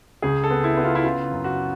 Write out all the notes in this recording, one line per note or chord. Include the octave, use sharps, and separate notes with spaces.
C#2 G#4
A4
B3
E4
B3
F4
E4
C#3 F4
F#2
F#4